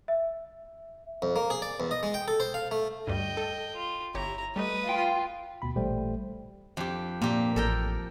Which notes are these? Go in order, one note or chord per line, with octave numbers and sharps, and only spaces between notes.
E5
F2
A#3
G#4
D5
E2
D#5
G#3
G5
A4
C5
F5
A3
D2 G2 G3 D#5 G5
A4
F4
G1 E4 G4 C#5 A#5
G3 A3 B4 D#5 D#6
F4 G5
D2 B2 B5
A1 A#2 G3 A3 C5 G5
F2 G4
A#2 A#3 G4
A1 A4 A#4 G5